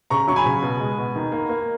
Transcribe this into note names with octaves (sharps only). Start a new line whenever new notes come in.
C#3 A#5 C#6
F#3 C#6
G#5 B5
C#3
B2
G#3
B2
D#3
A#3
A#3